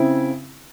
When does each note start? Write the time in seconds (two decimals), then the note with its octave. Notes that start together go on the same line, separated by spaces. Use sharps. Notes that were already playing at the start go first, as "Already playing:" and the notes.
Already playing: C#3 C4 E4